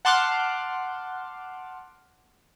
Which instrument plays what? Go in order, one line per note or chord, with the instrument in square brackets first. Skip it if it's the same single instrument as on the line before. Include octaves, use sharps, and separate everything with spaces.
[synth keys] F#5 A5 C6 D6 F6 F#6